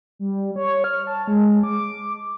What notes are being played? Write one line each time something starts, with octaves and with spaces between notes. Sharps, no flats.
G3
C#5
F6
A5
G#3
D6